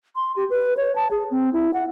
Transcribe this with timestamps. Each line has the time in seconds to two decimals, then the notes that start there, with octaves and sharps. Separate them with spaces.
0.16 C6
0.36 G4
0.50 B4
0.77 C#5
0.96 A5
1.11 G#4
1.31 C4
1.53 E4
1.74 F#5